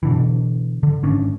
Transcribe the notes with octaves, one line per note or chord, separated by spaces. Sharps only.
B2 D3 E3
D3
G#1 C#4 D4